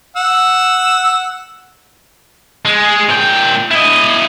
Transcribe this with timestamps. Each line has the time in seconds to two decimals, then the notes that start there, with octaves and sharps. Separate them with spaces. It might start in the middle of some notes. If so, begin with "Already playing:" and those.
0.17 F#5 E6
2.65 G#3
3.10 A#2 G5
3.71 E4 D#5